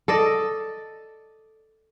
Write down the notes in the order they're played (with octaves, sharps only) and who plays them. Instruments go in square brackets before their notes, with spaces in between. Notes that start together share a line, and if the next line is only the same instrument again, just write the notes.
[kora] A4 D5 D#5